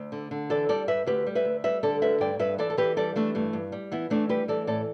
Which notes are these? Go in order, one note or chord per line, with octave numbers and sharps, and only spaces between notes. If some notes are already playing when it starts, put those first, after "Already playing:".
Already playing: D2
D3
D3
E3 A4 D5
G3 A4 D5
G2 B4 E5
D2 G4 B4
G3
B4 E5
D2
G3 B4 E5
D3 A4 D5
D2 B4 E5
G2 D5 G5
G2 B4 E5
E3 A4 D5
A4
E3 G4 B4
G3 A4 D5
E3 A3 D4
G2 A3
G2
G3
E3 B3 E4
E3 A3 D4
G3 G4 B4
E3 A4 D5
A2 A4 D5